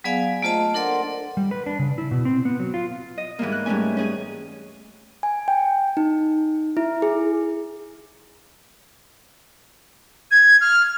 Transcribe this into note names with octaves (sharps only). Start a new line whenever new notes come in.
F#3 B3 G#4 D5 F5 G#5
A3 A#3 F4 C5 D#5 A5
D4 A4 A#4 D5 F#5 C6
G3
B4
D4
C#3
E4
B2
C4
B3
F#3
F4
D#5
G#2 E3 G3 A#3
F#6
G#2 G3 A3 C#4 G#5
C#4 G#4 G#5
G#5
G5
D#4
E4
G#4
G#6
F6